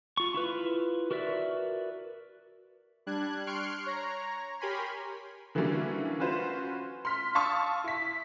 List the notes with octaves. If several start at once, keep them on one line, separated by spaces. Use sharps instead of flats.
F4 C#6
E4 F4 B4
F#4 A#4 B4 D5 E5
G3 D4 F#6 G#6
C6 C#6 F6 F#6 C7 D7
C#5 A#5
G4 A#4 C#5 G#5 B5 C6
D3 E3 F#3 G3 A#3 C#4
C#4 F4 F#4 B4 C5
C6 F6 B6
F5 A5 C6 C#6 D#6 E6
E4 B6